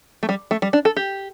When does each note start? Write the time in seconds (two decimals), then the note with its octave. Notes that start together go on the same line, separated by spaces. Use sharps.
0.23 A3
0.29 G3
0.51 A3
0.62 G3
0.73 D4
0.85 A4
0.96 G4